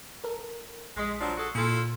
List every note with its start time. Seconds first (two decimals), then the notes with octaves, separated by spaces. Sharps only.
0.24 A4 A#4
0.96 A#1 G#3 C6 B6
1.19 F3 F#3 D4
1.37 F#4 G#4 A4
1.55 A#2 E4 F4 A4